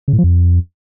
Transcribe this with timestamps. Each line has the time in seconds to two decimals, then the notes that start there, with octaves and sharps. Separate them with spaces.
0.08 C#3
0.13 A2
0.18 F3
0.24 F2